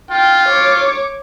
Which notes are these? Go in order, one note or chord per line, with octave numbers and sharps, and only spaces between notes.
F4 G5
C#5 D6